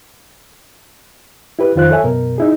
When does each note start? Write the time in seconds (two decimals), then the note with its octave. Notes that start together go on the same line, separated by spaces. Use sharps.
1.59 E4 G4 B4
1.76 F2 D#3 F4 C5 F#6
1.91 A4 C#5 E5 G#5
2.04 F#2 B2 A#4
2.38 D#4 E4 G#4